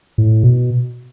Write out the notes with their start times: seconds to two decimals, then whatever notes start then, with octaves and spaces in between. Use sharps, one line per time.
0.18 A2
0.43 B2